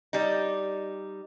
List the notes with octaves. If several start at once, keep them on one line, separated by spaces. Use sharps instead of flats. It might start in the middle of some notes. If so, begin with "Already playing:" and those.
G3 D#4